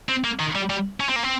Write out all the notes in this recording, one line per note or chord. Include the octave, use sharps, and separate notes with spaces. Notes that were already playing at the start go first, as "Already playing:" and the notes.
C4
A#3
D#3
G3
G3
C#4
C4
A#3
C4